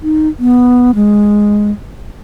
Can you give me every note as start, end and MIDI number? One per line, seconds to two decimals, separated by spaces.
0.03 0.29 63
0.39 0.91 59
0.95 1.71 56